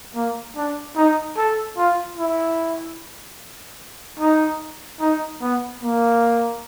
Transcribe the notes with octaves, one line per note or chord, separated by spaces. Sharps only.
A#3
D4
D#4
A4
F4
E4
D#4
D#4
B3
A#3